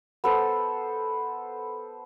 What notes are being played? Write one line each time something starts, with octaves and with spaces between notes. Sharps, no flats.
B3 A4 C5